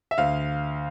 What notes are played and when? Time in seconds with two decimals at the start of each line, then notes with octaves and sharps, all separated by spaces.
0.11 E5
0.18 D2 F5